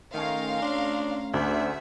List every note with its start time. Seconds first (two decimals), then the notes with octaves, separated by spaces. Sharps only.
0.14 D#3 A3 C#4 F5 A#5 C6
0.62 D4
1.34 D2 D4 G#4 E5